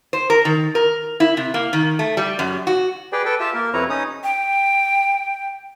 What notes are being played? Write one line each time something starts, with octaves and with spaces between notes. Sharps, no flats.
C5
A#4
D#3
A#4
E4
C3
A#3
D#3
A3
G3
F#2
F#4
G4 G#4 B4 D5 G5
A4 B4 G5
F4 G4 E5 A5
A#3 A#4
F2 C3 E4 B4 C#5 A#5
C#4 D#4 D#6
G5